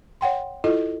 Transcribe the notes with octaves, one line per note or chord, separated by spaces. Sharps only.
C#5 F#5 G5 C6
E4 F4 A4 D#5